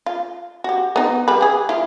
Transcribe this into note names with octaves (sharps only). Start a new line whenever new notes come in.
F4
F#4 G4
B3 D#4
G3 B4
G3 G#4
E4 F4